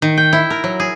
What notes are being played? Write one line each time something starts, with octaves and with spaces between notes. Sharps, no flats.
D#3
G5
E4
A#4
F#3
G#4